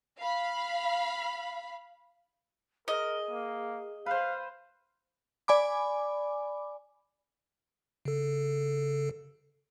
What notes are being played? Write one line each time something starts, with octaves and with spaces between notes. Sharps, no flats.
F5 B5
G#4 A#4 D#5
A#3
B4 C5 F5
D5 G#5 B5 D6
C#3 A4